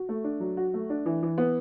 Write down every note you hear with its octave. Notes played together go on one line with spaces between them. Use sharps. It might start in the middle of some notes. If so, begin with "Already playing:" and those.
Already playing: F#4
A3
D4
F#3
F#4
A3
D4
E3
E3
B3